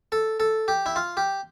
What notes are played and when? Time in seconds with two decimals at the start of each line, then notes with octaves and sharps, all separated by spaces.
0.12 A4
0.40 A4
0.68 G4
0.86 E4
0.96 F4
1.17 G4